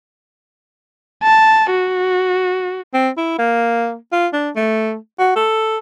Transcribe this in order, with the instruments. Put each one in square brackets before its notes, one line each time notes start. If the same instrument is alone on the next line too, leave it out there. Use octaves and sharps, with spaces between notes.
[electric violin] A5
F#4
[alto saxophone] C4
E4
A#3
F4
D4
A3
F#4
A4